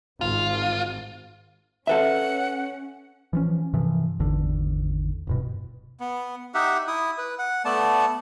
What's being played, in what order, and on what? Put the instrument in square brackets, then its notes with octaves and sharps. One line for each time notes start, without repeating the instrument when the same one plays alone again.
[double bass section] G#1 G#2 [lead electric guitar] F4
[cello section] C#4 [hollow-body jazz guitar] A4 B4 E5 [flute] F#5
[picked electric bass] E3 F3 C#4
G2 C3 E3 F3
G#1 E2 D3
D1 G2 B2
[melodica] B3
D#4 G4 E5 F#5
E4 D#6
B4
F#5
A3 B3 D5 A5